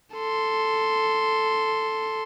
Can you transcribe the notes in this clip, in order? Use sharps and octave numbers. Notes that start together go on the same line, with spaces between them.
A4 C6